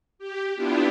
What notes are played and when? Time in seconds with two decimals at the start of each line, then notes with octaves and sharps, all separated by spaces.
0.19 G4
0.56 B3 D4 E4 F4 G4